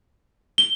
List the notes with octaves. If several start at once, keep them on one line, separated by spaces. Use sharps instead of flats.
G7